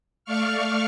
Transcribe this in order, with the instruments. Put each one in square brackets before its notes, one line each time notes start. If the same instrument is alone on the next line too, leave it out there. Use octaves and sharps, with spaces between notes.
[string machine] A3 D5 F5 C#6 F6